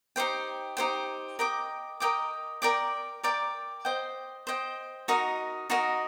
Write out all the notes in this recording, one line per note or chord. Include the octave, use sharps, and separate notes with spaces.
D#4 G4 C5 G5
D#4 G4 C5 G5
A#4 D#5 G5 D6
A#4 D#5 G5 D6
A#4 D5 G5 D6
A#4 D5 G5 D6
C5 D#5 G5
C5 D#5 G5
D#4 F#4 A#4 D#5
D#4 F#4 A#4 D#5